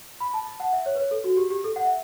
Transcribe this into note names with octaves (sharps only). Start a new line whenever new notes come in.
B5
A5
A5
F#5
E5
C#5
B4
C#5
A4
F#4
G4
G4
A4
F#5
E5